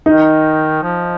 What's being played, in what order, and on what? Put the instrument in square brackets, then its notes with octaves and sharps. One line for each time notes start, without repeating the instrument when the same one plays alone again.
[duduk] D#3 [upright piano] D#4
[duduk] F3